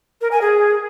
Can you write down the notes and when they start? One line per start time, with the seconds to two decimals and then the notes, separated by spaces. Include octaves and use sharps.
0.21 A#4
0.31 G#5
0.41 G#4